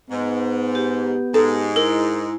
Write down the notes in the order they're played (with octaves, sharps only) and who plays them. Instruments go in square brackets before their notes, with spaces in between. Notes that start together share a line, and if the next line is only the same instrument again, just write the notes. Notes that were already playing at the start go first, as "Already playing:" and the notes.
[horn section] G#2 [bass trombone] B3
[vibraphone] G4
[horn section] G#2 G#3 [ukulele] A4
[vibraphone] E4 [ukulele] A#4